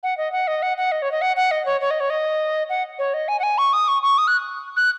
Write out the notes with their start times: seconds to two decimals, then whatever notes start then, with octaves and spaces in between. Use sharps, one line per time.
0.03 F#5
0.17 D#5
0.32 F#5
0.47 D#5
0.62 F#5
0.77 F#5
0.92 D#5
1.02 C#5
1.12 D#5
1.21 F#5
1.36 F#5
1.51 D#5
1.66 C#5
1.81 C#5
1.91 D#5
2.00 C#5
2.10 D#5
2.69 F#5
2.99 C#5
3.14 D#5
3.28 G#5
3.40 F#5
3.43 G#5
3.58 C#6
3.73 D#6
3.88 C#6
4.03 C#6
4.18 D#6
4.27 F#6
4.77 F#6